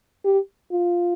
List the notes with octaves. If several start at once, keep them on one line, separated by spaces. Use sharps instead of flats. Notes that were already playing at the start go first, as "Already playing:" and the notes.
G4
F4